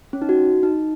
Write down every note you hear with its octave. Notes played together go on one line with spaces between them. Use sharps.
C#4
D#4
F#4
D#4